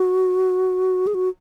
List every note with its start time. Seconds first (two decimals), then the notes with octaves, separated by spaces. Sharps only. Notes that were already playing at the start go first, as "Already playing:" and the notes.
Already playing: F#4
1.07 G#4
1.14 F#4